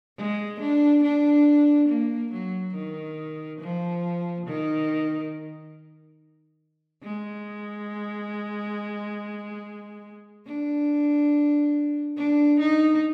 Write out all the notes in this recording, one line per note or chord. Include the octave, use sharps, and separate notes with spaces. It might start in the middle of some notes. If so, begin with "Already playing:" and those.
G#3
D4
D4
A#3
F#3
D#3
F3
D#3
G#3
D4
D4
D#4